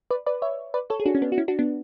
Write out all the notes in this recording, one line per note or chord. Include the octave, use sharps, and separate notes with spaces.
B4 D5
B4 D5
C#5 E5
B4 D5
A4 C#5
G#4
D4 F#4
C#4
B3 D4
F#4
C#4 E4
D4 F#4
B3 D4